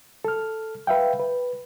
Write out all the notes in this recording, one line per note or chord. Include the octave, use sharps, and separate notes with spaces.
A4 F6
B4 E5 F5 G5
B4